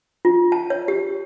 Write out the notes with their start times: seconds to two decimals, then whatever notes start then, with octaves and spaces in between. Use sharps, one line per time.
0.25 F4
0.52 A5
0.70 C#5
0.88 G4